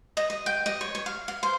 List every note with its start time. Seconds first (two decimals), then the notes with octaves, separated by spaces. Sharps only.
0.17 D#5
0.30 D#5
0.46 G5
0.66 D#5
0.81 C#5
0.95 C#5
1.06 F5
1.28 F5
1.43 C5